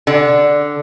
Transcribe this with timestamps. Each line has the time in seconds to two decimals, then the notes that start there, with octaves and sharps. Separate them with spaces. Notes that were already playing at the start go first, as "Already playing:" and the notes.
0.07 D3